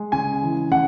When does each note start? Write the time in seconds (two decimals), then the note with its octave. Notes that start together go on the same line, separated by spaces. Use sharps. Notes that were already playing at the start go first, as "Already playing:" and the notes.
Already playing: G#3
0.12 C#3 G#5
0.42 E3
0.71 C#3 F#5